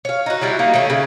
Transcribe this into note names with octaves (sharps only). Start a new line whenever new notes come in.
C#5 F5
D#4 F#4
F#3 G3 D4 E4
A#3 D#4 F#4
D#3 A3 C#4
C#3